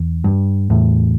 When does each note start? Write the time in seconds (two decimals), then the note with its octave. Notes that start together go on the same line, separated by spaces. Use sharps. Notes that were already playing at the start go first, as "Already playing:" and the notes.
Already playing: E2
0.24 G2
0.70 E2 A2